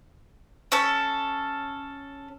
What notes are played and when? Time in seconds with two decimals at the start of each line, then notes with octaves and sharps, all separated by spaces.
0.72 C#4 A4 E6